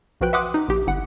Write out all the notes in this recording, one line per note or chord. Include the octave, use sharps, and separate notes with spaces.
B1 F3 F#4 B4 G5 F#6
E5 F#5 C6 D6 D#6 F#6
D#4
A#1 G4
G1 E4 F#5